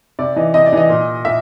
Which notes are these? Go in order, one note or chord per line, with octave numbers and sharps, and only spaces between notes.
C3 D5
E3 D#5
C3 D#5
D5
E3 D#5
A#2
A#2 E5